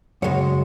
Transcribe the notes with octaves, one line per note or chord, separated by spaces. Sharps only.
F#2 C#3 G#3 C#5